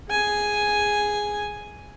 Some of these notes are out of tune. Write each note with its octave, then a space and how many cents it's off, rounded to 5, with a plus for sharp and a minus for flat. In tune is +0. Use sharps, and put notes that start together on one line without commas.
G#4 -5 G#5 +0